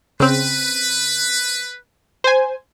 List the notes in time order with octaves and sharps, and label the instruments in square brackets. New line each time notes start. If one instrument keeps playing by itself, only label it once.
[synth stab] C#3 C4 [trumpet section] B4
[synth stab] C5 G#5